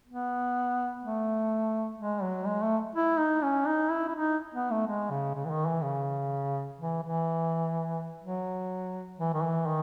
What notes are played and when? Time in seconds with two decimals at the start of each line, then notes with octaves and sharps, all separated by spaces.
0.07 B3
1.03 A3
1.99 G#3
2.22 F#3
2.47 G#3
2.63 A3
2.95 E4
3.19 D#4
3.42 C#4
3.66 D#4
3.91 E4
4.08 E4
4.15 D#4
4.54 B3
4.71 A3
4.87 G#3
5.10 C#3
5.35 C#3
5.45 E3
5.50 D#3
5.66 E3
5.82 C#3
6.78 E3
7.03 E3
8.22 F#3
9.19 E3
9.34 D#3
9.43 E3
9.67 D#3